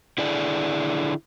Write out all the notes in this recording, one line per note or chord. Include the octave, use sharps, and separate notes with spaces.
D3 E4 G#4 D5